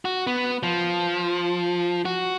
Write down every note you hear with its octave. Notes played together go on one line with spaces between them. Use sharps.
F#4
B3
F3
F#4